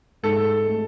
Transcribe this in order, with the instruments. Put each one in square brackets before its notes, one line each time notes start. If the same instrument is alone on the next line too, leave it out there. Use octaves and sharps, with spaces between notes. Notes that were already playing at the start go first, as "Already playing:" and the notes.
[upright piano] G#2 [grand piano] A4
[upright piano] A3